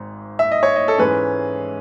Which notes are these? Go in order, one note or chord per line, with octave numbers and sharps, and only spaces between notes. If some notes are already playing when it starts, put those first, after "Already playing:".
Already playing: G#1 G#2
E5
D#5
C#5
D#5
A4
G#2 E3 G#3 C#4 B4